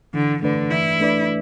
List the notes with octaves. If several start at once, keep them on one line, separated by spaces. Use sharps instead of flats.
D3 E3
D3 A3 D4 B4 D5
E3 E4
A3 D4 B4 D5